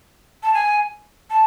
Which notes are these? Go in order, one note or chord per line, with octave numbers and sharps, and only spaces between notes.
A5
G#5
A5